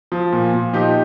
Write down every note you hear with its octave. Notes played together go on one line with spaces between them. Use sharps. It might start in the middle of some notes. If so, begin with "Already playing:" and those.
F3
A#2
A#2
F3 D#4 G4